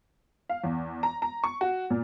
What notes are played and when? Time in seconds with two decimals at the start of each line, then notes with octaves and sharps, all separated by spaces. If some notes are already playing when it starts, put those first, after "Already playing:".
0.49 F5
0.64 E2
1.03 A#5
1.22 A#5
1.44 C#6
1.61 F#4
1.90 A#2